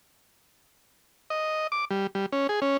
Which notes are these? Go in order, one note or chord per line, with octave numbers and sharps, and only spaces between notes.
D#5
D6
G3
G3
C#4
G#4
C#4